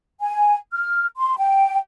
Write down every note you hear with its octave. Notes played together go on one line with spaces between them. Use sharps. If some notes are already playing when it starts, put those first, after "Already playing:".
G#5
F6
C6
G5